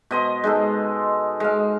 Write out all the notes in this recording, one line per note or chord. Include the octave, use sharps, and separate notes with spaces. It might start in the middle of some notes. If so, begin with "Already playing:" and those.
B2 D#5 C6
G#3 D#4 A4
G#3 F5